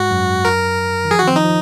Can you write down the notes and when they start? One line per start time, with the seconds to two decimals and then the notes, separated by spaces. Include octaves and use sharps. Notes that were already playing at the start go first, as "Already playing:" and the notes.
Already playing: G#2 G#3 F#4
0.11 F#2 F#3
0.45 A#4
1.05 D#3
1.11 F3 G#4
1.19 D#3 F#4
1.27 C4
1.34 F3 D#4
1.44 F3